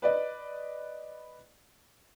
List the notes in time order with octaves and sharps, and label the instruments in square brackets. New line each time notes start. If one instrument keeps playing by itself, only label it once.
[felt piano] B4 D5 D#5